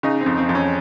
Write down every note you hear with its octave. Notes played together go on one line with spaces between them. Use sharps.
C#3 D#4
C4
F2
C4
F2
C#4